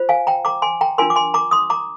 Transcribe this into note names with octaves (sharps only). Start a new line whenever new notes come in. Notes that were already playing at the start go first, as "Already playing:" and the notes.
Already playing: F4 C5
F5 G#5
G5 A#5
A#5 D6
G#5 C6
G5 A#5
D4 F4 A#4 G#5 C6
D6
G#5 C6
A#5 D6
C6 D#6
A#5 D6